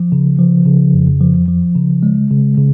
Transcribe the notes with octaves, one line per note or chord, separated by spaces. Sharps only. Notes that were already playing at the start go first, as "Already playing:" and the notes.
Already playing: F3
C#3
F3
C#3
F2
F3
F3
C#3
G#3
C#3
C#3